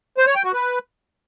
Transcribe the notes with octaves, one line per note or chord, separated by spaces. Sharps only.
C5
C#5
G5
F#4
B4